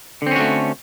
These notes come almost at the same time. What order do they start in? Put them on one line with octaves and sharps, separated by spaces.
D3 C4 C#4 F#4 A3